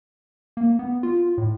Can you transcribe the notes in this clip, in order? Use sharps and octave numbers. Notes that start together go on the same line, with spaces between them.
A#3
B3
F4
A2